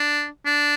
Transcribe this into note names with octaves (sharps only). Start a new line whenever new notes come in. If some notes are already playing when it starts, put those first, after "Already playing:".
Already playing: D4
D4